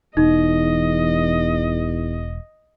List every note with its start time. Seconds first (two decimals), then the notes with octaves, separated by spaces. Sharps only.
0.17 E1 E2 D#4 D#5